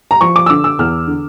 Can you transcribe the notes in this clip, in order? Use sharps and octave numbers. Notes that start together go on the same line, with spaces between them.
A#5
F3 C#6
D6
E6
D3 D6
E6
E2 F6
D3